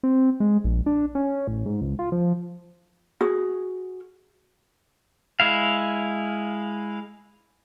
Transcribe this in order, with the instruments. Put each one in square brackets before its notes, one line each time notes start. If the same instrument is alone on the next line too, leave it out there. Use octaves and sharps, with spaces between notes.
[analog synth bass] C4
G#3
A#1
D4
C#4
A1
G#2
C#2
F4
F3
[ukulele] F#4 G#4
[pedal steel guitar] G#3 E4 F5